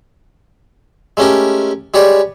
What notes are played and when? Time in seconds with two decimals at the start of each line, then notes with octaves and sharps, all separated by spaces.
1.17 G#3 A3 C#4 G4 A#4
1.94 G#3 G4 B4 C#5 D5